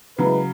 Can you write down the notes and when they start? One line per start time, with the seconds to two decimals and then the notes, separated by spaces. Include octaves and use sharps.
0.18 C#3 F#3 G#3 E4 B4